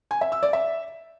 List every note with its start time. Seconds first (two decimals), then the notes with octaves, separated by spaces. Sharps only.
0.11 G#5
0.21 E5
0.32 E6
0.43 D5
0.53 E5